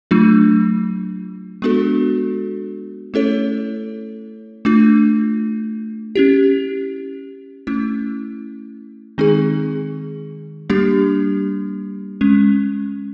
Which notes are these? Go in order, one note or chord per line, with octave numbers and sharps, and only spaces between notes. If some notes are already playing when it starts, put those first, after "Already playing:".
F#3 A3 D4 F4
G#3 B3 D4 F#4 A4
A3 C#4 E4 A4 C#5
A3 D4 F4
C#4 E4 G4
A3 C#4 E4
D#3 G#3 C4 D#4 G#4
G3 A#3 D4 G4
G#3 C#4